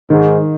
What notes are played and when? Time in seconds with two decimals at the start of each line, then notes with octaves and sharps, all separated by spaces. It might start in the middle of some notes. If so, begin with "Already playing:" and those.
0.10 G#2 D#3